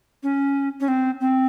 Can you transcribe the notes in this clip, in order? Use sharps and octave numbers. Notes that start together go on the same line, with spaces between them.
C#4
C#4
C4
C4